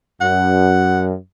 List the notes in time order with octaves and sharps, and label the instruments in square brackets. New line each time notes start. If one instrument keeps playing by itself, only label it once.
[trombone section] F#2 [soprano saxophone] F#5